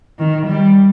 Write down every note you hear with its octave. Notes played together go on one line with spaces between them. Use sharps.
D#3
G3